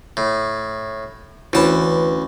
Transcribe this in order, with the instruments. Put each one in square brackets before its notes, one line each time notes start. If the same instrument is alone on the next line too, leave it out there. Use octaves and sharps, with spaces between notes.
[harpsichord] A2
[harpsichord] D2 A5 [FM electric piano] E3 C#4 B4